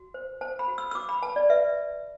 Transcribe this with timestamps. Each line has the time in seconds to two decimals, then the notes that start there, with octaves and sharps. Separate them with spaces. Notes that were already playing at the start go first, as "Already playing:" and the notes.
Already playing: F#4
0.14 C5
0.41 C5 A5
0.59 B5
0.68 F#4
0.78 E6
0.91 E6
0.95 F#4 D6
1.09 B5
1.22 B4 A5
1.36 D5
1.49 B4 E5